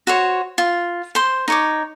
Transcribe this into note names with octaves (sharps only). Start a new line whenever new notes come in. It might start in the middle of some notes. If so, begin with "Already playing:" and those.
F#4 C5 C#5
F4
C5 C6
D#4 C#5 D6